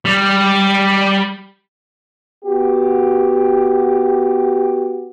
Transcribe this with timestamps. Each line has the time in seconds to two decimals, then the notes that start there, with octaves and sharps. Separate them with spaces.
0.05 G3
2.45 B3 F#4 G4